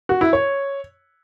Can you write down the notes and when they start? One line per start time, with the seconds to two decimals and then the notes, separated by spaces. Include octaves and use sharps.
0.09 F#4
0.21 E4
0.33 C#5